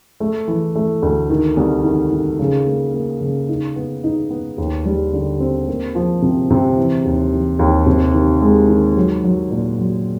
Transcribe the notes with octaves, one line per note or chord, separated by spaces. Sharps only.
A3
E3
A3
D2
D#3
C2
D#3
D#3
C#3
A#3
A#3
C#3
D#4
B3
D#4
B3
D#2
G3
D3
C4
A#3
F3
C3
C3
E3
D#2
E3
D#2
C3
D#3
G#3
D#3
F#3
F#3
A#2
F#3